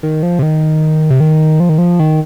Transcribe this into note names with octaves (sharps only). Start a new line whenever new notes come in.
D#3
F3
C3
D#3
C3
D#3
F3
D#3
F3
D#3